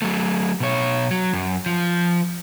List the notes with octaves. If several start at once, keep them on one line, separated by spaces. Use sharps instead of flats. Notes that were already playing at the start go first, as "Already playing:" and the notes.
F#3 A3
B2 C#5
F#3
F#2
F3